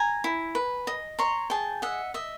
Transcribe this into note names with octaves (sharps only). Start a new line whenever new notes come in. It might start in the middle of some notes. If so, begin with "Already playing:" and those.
Already playing: G#5 A#5
E4
B4
D#5
C#5 A#5 C6
G#4 G5 A5
D#5 E5 F#5
D#5 E5